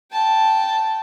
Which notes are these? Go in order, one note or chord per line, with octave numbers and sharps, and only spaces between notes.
G5 A5